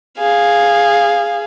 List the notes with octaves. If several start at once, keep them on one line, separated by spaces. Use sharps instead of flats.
G#4 F5